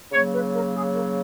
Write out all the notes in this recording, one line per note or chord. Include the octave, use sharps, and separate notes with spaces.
C#3 F#3 A#3 C#5
B4
A#4
G#4
A#4